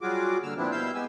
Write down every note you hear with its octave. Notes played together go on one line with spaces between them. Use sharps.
F#3 G3 F4 F#4 G#4 D6
G2 D3 A#3 E6 F6
A#2 F3 B3 C4 D4 E4
B2 G3 E4 F5 E6 G6
G#3 B3 G4 G#5 E6